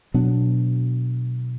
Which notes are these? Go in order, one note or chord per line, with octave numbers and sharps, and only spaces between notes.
B2 F#3 B3 D4